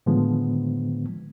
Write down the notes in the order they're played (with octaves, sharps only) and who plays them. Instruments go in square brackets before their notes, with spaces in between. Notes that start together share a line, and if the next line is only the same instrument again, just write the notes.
[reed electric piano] A2 D3 D#3 F3 G#3 B3